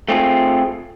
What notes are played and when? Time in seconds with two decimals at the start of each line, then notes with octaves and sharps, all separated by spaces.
0.08 A3 C4 F4 G#4